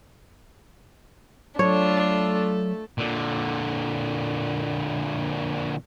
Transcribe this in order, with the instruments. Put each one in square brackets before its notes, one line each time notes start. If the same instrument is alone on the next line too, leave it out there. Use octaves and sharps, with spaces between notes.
[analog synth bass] F#3 [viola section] A3 A4 [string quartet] D4 F4 [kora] C#5
[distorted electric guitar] A#2 D3